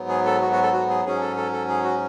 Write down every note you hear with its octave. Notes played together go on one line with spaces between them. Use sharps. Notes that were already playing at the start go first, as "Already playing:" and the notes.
Already playing: G#2 F#3 B3
G#4
A4
F#4
F#4
A4
F#4
G#4
G#2 F#3 C#4 G#4
A4
A4
A4
G#4
F#4